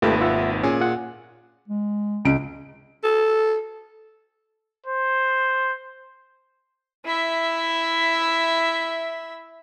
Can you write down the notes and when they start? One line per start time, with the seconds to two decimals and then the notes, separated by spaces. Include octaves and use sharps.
0.02 G#1 D#2 A3 F4 G4 B4
0.21 F4 E5 F#5
0.63 A#2 C#4 G#4
0.81 F4 F#5
1.68 G#3
2.25 C#2 D7
3.04 A4
4.86 C5
7.05 E4 E5